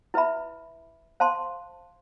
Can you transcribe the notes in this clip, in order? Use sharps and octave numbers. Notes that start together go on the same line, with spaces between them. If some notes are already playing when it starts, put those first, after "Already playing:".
E4 B4 E5 B5
C5 F5 A5 C6